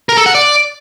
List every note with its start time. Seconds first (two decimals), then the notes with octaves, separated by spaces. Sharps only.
0.09 A#4
0.18 A4
0.26 F#5
0.35 D5